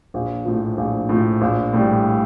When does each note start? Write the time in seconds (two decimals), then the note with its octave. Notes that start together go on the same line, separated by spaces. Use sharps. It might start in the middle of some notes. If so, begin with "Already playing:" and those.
0.14 A#1
0.45 A2 F3
0.77 A#1
1.09 A2 F3
1.41 A#1
1.73 A2 G3